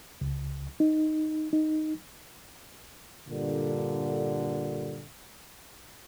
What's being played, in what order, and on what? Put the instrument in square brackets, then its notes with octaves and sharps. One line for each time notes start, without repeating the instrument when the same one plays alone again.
[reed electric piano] C#2
D#4
D#4
[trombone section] G2 A#2 D3